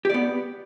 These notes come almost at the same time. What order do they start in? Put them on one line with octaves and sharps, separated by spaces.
G4 D5 B3